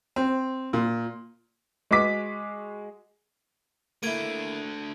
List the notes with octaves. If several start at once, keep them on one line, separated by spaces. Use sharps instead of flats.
C4
A#2
G#3 F#4 G#4 D6 B6
D3 A3 A#3 E4 G#6 D7 D#7